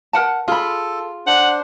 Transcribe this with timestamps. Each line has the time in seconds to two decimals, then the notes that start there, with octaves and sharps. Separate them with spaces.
0.13 A#4 F#5 A5
0.48 F4 G#4 A4 B5
1.27 D4 C5 F#5